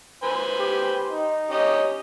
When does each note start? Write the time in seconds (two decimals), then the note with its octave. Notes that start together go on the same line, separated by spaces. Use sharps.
0.23 B4 C5 G#5
0.59 G4
1.11 D#4
1.51 C#4 G4 D#5